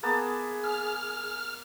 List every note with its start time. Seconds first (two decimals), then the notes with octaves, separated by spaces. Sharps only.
0.03 A#3 B3 G#4 A5
0.64 F6